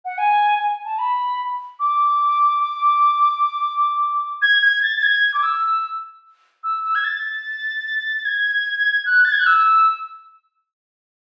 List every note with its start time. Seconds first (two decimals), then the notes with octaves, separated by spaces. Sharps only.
0.04 F#5
0.17 G#5
0.58 G#5
0.85 A5
0.98 B5
1.79 D6
2.59 D6
4.41 G#6
4.61 G#6
4.82 A6
4.96 A6
5.02 G#6
5.33 D6
5.42 E6
6.63 E6
6.83 E6
6.94 G#6
7.04 A6
8.24 G#6
9.05 F#6
9.24 A6
9.31 G#6
9.39 F#6
9.46 E6